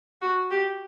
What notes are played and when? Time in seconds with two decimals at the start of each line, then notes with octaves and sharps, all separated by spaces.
0.22 F#4
0.51 G4